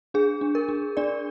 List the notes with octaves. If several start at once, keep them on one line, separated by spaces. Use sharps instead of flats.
D4 G#4
D4
A#4
D4
D4 D5